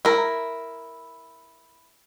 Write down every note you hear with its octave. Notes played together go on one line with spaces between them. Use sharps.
E4 A#4